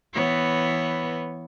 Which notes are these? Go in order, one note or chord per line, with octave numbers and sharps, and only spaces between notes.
E3 B3 C#5